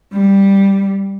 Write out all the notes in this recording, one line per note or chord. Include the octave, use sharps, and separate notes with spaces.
G3